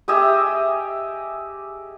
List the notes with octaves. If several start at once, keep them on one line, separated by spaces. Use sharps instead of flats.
G4 G#4 D#5 E5